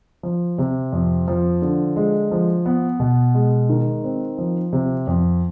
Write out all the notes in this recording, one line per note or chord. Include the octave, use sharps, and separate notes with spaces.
F3
C3
F2
F3
D3
G#3
F3
B3
B2
G#3
D#3
C4
F3
C3
F2